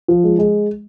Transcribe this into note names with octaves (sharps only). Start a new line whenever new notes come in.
F3
G#3
G#3